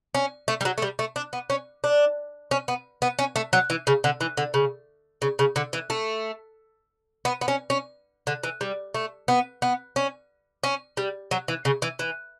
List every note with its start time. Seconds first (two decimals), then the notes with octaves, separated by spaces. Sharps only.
0.14 C#4
0.48 A3
0.61 G3
0.65 F#3
0.78 A3
0.82 G3
0.99 A3
1.16 D4
1.33 B3
1.50 C#4
1.84 D4
2.51 C#4
2.68 B3
3.02 B3
3.19 C#4
3.36 A3
3.53 F#3
3.70 E3
3.87 C#3
4.04 D3
4.21 E3
4.37 D3
4.54 C#3
5.22 C#3
5.39 C#3
5.56 D3
5.73 E3
5.90 A3
7.25 B3
7.41 B3
7.48 C#4
7.70 C#4
8.27 D3
8.43 E3
8.61 G3
8.94 A3
9.28 B3
9.62 B3
9.96 C#4
10.63 C#4
10.97 G3
11.31 F#3
11.48 E3
11.65 C#3
11.82 E3
11.99 E3